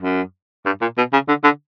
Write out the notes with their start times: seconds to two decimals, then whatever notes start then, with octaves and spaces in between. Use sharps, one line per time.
0.03 F#2
0.66 G2
0.81 A#2
0.98 B2
1.13 C#3
1.28 D3
1.44 D3